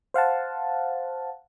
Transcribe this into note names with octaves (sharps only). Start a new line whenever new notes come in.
C5 F5 F#5 A5